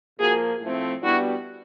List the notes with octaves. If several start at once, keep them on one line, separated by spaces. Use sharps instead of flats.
A#2 F3 A#3 F#4 G#4
A2 F3 A3 C4
B2 G3 B3 D4 E4 F#4